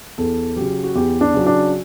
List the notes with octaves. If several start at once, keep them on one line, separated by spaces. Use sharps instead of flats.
E2 A4
C#3 F#3 G4
F#4
E2 G4
D4
C#3 F#3
D4